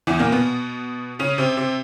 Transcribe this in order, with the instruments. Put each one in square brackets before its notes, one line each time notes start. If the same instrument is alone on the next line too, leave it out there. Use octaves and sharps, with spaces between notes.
[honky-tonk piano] E2 E3
A#2 A#3
B2 B3
C#3 C#4
C3 C4
C3 C4